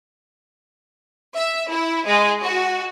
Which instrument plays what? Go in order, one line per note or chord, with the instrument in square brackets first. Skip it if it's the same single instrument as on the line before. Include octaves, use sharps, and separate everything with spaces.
[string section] E5
E4
G#3
F#4